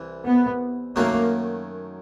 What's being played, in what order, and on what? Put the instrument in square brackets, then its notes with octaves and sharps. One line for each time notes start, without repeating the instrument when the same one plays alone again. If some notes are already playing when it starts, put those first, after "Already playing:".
Already playing: [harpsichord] C2 E3
[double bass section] B3
[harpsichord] F#2 D#3 F#3 A3 [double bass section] A#3